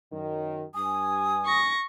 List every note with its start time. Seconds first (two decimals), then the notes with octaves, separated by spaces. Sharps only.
0.12 F#2 D#3
0.75 G2 G#5 D#6
1.45 C#6 A#6